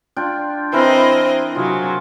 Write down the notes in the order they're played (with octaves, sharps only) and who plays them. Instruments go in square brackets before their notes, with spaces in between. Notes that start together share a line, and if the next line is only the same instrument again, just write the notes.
[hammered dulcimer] D4 F4 G5
[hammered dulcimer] E3 E4 A#4 [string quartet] C4 D#5
[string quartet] C3 F#3 [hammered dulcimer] F4 G#4